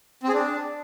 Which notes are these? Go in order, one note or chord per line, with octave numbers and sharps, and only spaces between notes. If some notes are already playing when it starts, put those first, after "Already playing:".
C4
G#4
D4